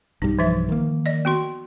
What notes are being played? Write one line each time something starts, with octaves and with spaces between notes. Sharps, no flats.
B1 G2 G3 D#4
E3 F3 E5
D#3 A#3
D5 D#5
B3 F#4 C6